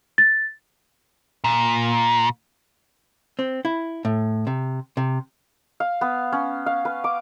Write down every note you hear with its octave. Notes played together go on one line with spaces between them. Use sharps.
A6
A#2
C4
E4
A2
C3
C3
F5
B3
C#4
F5
B4
D6